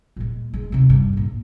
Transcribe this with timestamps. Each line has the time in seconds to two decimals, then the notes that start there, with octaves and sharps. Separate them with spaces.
0.16 A#2 G#3
0.54 G#3
0.72 C3 D#3
0.90 G2
1.13 A#1 G#2